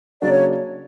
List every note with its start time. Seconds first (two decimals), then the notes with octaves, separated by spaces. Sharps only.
0.22 C#3 F#3 A#3 D4 F#4 D5
0.31 C#5